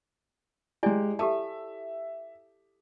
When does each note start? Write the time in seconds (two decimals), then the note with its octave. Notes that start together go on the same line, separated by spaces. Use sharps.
0.83 G#3 E4 G4 D5 G#5
1.19 G4 A4 E5 A5